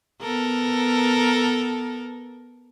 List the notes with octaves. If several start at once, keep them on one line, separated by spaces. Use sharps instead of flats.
B3 A4 A#4